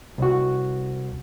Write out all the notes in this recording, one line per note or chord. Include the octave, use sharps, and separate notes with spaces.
C2 F#4